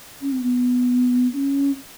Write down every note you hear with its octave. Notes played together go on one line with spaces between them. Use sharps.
C#4
C4
B3
D4
C#4